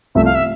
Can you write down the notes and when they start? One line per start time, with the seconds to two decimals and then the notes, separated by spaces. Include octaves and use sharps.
0.15 C2 C3 F3 A3 E5
0.25 F5
0.35 E5